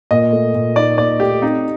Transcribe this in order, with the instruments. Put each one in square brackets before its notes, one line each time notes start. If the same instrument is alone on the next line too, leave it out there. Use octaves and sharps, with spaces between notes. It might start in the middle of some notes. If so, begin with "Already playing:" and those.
[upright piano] A#2 [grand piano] D#5
[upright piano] A3
A#2
[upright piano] D#4 [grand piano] D5
[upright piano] A#2 [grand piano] D5
[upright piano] A3 [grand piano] G4
[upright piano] C4 [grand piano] D#4